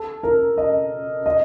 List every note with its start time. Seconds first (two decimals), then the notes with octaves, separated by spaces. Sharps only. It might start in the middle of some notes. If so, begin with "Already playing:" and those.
Already playing: A4
0.23 A#4
0.57 D#5
1.26 D#5